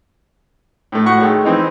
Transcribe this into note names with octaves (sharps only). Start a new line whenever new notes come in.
A2 A3
A2 F#4 F#5 C#6
D#3 G#3 A3
E3 C4 D#4